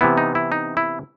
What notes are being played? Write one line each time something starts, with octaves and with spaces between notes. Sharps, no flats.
C3 E3 B3 E4
D#4
E4
D#4
E4